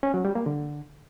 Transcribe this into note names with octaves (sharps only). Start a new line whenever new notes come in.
C#4
F#3
G3
A#3
D3